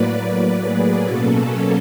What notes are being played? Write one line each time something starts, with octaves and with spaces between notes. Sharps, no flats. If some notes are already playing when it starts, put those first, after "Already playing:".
Already playing: A2 F#3 A#3 B4 D5
G#4
B2 F#3 A#3 C#4 A4